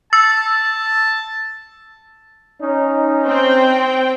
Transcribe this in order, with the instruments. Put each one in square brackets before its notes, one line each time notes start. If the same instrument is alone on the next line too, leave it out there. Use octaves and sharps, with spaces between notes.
[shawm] A5 [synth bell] E6 A6
[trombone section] C#4 D#4
[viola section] C4 G5